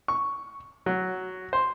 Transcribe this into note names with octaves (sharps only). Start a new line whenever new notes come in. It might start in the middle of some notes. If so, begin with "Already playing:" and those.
C#6
F#3
C5